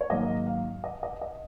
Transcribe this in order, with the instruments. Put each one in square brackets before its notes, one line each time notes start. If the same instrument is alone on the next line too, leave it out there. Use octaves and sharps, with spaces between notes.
[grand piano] C#5
G#2 D#3 F#3 A#3 D#5
F5
D#5
D#5
D#5